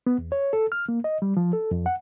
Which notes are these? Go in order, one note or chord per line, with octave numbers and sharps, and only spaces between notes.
B3
E2
C#5
A4
F6
A#3
D#5
G3
F3
A4
F2
F#5